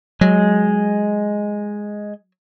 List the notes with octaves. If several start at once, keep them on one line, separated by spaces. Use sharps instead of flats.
F#3 G#3